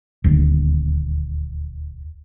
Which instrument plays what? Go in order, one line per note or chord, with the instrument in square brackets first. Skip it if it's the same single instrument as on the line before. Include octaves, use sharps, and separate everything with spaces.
[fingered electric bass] D#1 D2